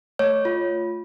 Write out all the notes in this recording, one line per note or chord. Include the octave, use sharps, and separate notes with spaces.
A3 C#5
F4